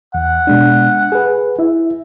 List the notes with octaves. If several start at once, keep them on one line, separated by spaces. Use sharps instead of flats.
E2 F#5
B2 G#3 D4
G#4 B4
E4 E5